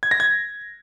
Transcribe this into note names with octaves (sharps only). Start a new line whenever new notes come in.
G#6
A#6
G#6